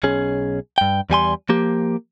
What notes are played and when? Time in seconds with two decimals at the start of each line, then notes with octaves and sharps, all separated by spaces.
0.03 B1 C#4 G#4
0.78 G2 G5
1.10 E2 G3 G#5 C6
1.49 F3 A#3 G4